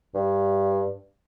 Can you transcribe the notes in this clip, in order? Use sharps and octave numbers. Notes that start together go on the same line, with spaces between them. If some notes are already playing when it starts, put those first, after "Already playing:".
G2